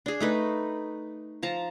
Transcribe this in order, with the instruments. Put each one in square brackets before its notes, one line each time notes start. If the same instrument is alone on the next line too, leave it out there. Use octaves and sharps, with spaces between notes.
[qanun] D4 G#4
A3 D#4 B4
F3 A5 A#5